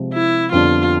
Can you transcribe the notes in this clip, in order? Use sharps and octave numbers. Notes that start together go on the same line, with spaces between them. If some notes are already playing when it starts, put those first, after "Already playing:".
Already playing: C3 F3 G#3
E4
F2 D3 G3 B3 D4 F4